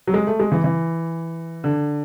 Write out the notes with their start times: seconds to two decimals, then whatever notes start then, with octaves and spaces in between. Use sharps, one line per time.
0.07 F#3
0.14 G#3
0.27 A3
0.39 G#3
0.52 E3
0.64 E3
1.64 D3